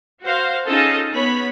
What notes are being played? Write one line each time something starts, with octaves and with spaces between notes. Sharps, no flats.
F#4 C5 F5
C#4 D#4 F4 G#4 A4 D#5
B3 C#5 B5